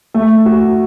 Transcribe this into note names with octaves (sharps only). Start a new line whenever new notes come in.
A3
F#4